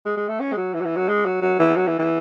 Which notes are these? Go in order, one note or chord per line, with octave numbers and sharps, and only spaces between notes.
G#3
G#3
A3
C#4
G#3
F#3
E3
F#3
E3
F#3
G#3
F#3
F#3
E3
F#3
E3
E3